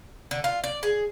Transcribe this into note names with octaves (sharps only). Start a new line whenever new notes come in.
D3
F4
D5
G#4